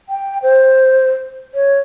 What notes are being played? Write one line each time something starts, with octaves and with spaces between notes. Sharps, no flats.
G5
C5
C#5